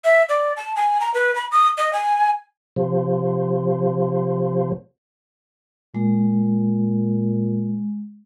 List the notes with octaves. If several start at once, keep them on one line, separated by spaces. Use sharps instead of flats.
E5
D5
A5
G#5
A#5
B4
B5
D#6
D#5
G#5
C3 F3
A#2 G#3